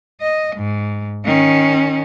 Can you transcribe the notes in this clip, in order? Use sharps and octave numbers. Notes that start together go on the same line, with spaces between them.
D#5
G#2
D#3 C#4